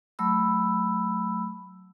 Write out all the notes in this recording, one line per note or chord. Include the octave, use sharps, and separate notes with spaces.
F#3 A3 B5 E6